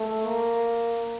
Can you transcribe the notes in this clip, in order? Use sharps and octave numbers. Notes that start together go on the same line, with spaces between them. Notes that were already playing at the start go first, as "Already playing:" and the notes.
Already playing: A3
A#3